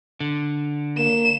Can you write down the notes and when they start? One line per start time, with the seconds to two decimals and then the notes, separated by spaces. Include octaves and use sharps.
0.20 D3
0.98 A#3 E7